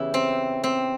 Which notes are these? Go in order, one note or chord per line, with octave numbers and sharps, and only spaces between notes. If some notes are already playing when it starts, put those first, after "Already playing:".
Already playing: E2 C#3 E3 E4 G4
C4
C4